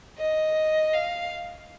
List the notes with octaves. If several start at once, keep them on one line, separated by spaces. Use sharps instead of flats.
D#5
F5